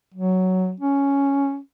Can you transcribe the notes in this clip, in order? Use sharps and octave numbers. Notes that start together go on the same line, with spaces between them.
F#3
C#4